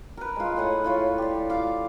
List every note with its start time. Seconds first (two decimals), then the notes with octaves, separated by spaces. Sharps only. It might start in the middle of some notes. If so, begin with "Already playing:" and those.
0.17 A#4 B4
0.36 G#3 F4
0.56 A2 G#4 F#5 G#5
0.84 E4 F4 C#5
1.18 G4 D5
1.50 F4 F5 D6